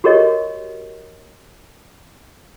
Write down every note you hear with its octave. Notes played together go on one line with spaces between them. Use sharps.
F#4 G4 A#4 C#5 D#5